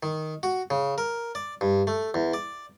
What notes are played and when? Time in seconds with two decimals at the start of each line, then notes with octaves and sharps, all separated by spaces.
0.03 D#3
0.43 F#4
0.70 C#3
0.98 A#4
1.35 D5
1.61 G2
1.87 A3
2.14 E2
2.34 D5